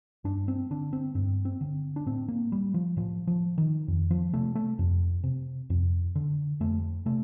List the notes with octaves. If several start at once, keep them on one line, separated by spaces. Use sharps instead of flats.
G2 D4
C4
D3 D4
C4
G2 C4
C4
D3
D4
A2 C4
A#3
G3
F3
A2 F3
F3
D#3
F2
F3
C3 A3
A3
F2
C3
F2
D3
F2 A3
C3 A3